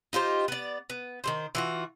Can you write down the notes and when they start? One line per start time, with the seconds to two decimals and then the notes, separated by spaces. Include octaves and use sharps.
0.13 D#4 F4 G4 C5
0.48 B3 D5
0.90 B3
1.24 D#3 F#3 C5
1.55 E3 F4 F#4